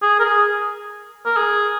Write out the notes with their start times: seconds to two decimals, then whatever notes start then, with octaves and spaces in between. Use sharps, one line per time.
0.02 G#4
0.20 A#4
0.24 G#4
1.25 A#4
1.37 G#4